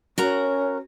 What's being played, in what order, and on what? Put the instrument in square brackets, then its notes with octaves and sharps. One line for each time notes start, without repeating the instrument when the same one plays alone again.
[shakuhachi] C#4 [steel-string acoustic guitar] F#4 A#4 A#5